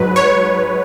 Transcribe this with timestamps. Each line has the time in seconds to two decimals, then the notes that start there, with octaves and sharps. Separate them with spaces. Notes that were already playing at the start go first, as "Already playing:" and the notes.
Already playing: G#2 F#3 B4
0.16 C#5